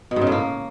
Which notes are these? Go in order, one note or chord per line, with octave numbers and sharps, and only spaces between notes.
B2
G#2
C#3
A2
A#3